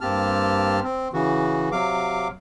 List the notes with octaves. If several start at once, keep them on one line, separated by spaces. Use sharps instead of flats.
G2 A#3 C4 G4 A5 F6
C4
C#3 E3 F#4
C3 F#3 F5 D6